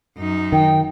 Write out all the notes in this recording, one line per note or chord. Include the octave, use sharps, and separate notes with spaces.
F#2 D#4
D#3 G5